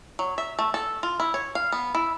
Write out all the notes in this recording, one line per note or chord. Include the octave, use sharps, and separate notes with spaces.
F#3
E5
A3
A4
F4
E4
C#5
F5
B3
E4